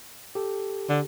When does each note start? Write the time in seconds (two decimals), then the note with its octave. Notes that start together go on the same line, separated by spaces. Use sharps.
0.35 G4 A4
0.89 D3